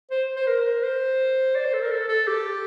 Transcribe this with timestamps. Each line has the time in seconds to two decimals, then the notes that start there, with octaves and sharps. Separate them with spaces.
0.11 C5
0.36 C5
0.47 A#4
0.83 C5
1.55 D5
1.64 C5
1.73 A4
1.82 A#4
1.91 A4
2.08 A4
2.27 G4